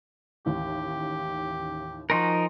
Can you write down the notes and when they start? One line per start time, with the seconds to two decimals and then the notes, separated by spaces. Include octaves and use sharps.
0.46 A1 D#2 G4
2.10 F3 D#4 F#4 A#4 G#5 C6 A#6